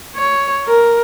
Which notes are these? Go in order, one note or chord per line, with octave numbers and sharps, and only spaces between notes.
C#5
A#4